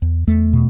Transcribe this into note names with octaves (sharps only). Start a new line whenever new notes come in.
E2
E2 A3
B2